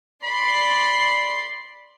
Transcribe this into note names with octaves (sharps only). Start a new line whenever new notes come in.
D5 B5 C6 C7